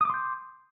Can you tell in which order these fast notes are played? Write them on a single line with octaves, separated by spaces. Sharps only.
D#6 D6 C6 G6